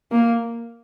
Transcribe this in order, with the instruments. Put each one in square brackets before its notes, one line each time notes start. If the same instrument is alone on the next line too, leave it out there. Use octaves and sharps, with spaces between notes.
[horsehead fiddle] A#3